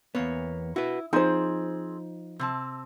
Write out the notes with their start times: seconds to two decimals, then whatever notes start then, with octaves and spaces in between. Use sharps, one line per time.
0.15 E2 A#3 B3 C#5
0.76 E4 F#4 B4
1.13 F3 C4 D#4 G#4 C5
2.39 C3 C4 A5